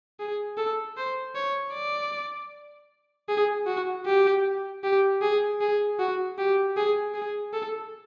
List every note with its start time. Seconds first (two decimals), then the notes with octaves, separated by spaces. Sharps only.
0.20 G#4
0.57 A4
0.97 C5
1.35 C#5
1.73 D5
3.29 G#4
3.67 F#4
4.06 G4
4.84 G4
5.22 G#4
5.61 G#4
5.99 F#4
6.38 G4
6.77 G#4
7.14 G#4
7.53 A4